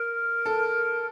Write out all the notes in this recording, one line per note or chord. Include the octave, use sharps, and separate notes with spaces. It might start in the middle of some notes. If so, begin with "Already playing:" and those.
Already playing: A#4
A4